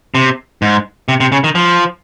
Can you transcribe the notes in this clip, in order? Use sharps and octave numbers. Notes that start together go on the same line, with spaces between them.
C3
G#2
C3
C3
C#3
D#3
F3